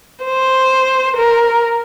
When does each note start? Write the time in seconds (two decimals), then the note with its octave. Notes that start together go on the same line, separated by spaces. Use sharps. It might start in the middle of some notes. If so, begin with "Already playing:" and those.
0.24 C5
1.17 A#4